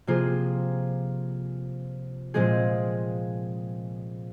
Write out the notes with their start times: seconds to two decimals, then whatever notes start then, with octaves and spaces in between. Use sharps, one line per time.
0.07 C3 F3 A#3 F4 G#4
2.34 A#2 F3 G#3 C4 G#4